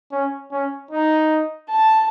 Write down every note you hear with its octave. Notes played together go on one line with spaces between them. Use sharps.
C#4
C#4
D#4
A5